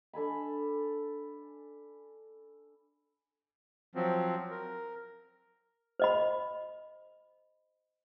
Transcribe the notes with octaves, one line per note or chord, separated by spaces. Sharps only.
D4 A4 G#5 B5
F3 F#3 C4
A#4
C5 D#5 B5